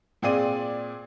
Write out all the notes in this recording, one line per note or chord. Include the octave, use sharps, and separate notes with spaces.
A#2 C4 G#4 D5 D#7